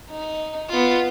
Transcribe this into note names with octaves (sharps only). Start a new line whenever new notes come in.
D#4
B3 F4